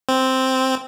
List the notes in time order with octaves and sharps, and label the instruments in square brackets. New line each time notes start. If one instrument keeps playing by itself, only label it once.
[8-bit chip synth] C4